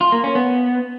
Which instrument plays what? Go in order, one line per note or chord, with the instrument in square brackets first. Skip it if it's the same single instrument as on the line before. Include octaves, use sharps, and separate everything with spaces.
[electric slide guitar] F4
A#3
C#4
B3